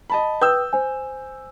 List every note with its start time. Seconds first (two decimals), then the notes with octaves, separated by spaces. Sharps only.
0.10 D#5 A5 B5
0.42 B4 G5 D#6 E6 G6
0.73 C5 G#5